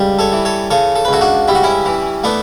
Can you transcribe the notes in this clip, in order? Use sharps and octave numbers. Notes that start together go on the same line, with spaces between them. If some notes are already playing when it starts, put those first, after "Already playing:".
Already playing: C#2 G3
A4 C#5
E3
A4 C#5
C#3 A4 C#5
A4
B4
C#2 F#4 A4
D4 F#4
G3 E4
F#4
C#4 E4
E3
A3 B3 D4